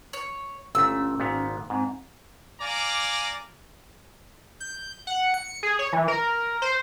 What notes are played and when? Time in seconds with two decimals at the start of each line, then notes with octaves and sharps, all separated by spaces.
0.13 C#5
0.75 G1 A#2 A3 C#4 E6
1.20 G#1 A#2 B3
1.70 G#2 C4
2.61 D5 F5 G#5 A#5 D6
4.60 G6
5.07 F#5
5.34 C#7
5.63 G#4
5.79 C#5
5.93 E3
6.08 A#4
6.62 C5